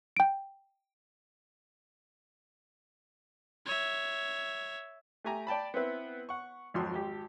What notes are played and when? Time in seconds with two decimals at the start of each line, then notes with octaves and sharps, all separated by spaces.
0.17 G5 D7
3.66 C#5 E5
5.24 A3 G4 G#5 A#5
5.47 D5 G5 A5 B5
5.74 B3 C4 E4 B4
6.29 F#5 C#6
6.74 G#1 F2 F3 F#3 C6
6.95 G#1 G4